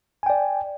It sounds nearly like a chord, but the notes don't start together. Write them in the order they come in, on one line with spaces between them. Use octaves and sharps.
G#5 G5 D5